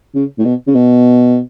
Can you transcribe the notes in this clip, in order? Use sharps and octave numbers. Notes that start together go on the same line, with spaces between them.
C#3
A2
B2
C#3
B2